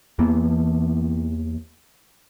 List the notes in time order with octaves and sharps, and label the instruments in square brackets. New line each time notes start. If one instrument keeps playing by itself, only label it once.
[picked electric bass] E2 E3 A#3 B3